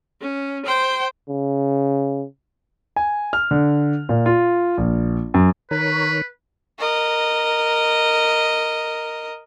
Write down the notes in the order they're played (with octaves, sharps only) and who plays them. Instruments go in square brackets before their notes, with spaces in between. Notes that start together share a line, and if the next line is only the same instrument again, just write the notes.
[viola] C#4
C5 G5
[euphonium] C#3
[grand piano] G#5
F6
D3
A#2
F4
A#1
F#2
[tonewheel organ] D#3 A#4 C#5 [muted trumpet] B4
[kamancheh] A#4 D#5